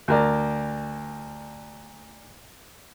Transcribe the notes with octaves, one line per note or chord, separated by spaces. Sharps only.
D2 A#4 D5